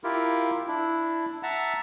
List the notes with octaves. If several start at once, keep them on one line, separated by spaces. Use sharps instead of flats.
E4 F4 G4 A#4
D4 E4
E5 F#5 A5 A#5